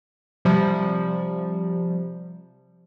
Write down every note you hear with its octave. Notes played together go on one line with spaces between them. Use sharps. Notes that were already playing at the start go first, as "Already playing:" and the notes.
C3 F3 G3